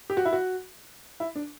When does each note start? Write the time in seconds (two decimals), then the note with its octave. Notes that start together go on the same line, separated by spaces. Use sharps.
0.10 G4
0.17 F#4
0.25 E4
0.33 F#4
1.20 E4
1.35 D4